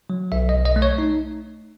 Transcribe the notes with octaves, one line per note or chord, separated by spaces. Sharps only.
F#3
B1 E5
D#5
B1
D#5
A3
C#5
D#4